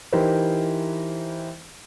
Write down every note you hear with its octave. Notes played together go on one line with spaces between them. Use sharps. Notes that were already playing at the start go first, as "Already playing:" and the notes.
E3 D#4 E4 G4 A#4 C5